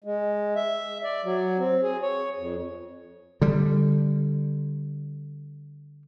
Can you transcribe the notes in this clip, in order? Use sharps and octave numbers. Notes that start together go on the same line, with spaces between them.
G#3
E5
D5
F#3
C4
G#4
C#5
F2
D3 G3